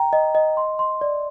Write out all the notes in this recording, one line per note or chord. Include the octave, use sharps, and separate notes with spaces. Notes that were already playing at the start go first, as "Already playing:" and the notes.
Already playing: G5 A#5
D#5
D#5
C6
C6
D5